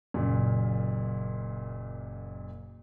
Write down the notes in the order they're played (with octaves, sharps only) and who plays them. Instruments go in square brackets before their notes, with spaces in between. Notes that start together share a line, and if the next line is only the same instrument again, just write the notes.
[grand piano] F#1 F#2 A#2